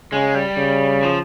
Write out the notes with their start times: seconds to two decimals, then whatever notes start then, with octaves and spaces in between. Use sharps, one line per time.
0.12 C#3 G#3
0.35 G3
0.58 C#3
1.03 F3